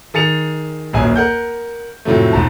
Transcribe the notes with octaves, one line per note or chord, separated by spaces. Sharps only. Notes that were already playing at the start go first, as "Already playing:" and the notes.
D#3 G#4 A6 C#7 F7
D#1 A#1 F#2 F#3 G#5
A#4 F#5 G6
F2 A2 C3 F#3 A3
E1 G#2 A5